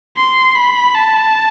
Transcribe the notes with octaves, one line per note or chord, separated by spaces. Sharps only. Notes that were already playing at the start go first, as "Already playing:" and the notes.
C6
B5
A5